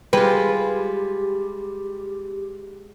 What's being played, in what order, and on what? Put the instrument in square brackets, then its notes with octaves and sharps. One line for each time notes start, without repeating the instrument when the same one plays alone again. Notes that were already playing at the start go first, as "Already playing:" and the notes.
[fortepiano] G3 [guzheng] G#3 F4 [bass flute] G4 [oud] B4